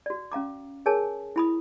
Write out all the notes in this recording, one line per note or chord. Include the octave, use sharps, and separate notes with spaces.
F#4 D5
C#4 F5 A#5 D6
G#4 A#4 C#5 G#5 A5
E4 B5 D#6